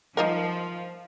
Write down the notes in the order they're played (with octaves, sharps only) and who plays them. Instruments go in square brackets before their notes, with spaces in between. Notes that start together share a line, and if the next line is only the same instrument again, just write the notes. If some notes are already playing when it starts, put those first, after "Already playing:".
[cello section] F3 [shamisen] D#4 F4 A#4